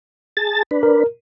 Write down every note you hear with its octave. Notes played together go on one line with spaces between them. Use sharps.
G#4 A5 A6
D4 B4
A#4